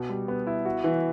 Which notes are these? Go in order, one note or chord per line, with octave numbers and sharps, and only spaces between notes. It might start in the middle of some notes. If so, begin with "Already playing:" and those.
Already playing: B2
G3
B3
E4
F#4
E3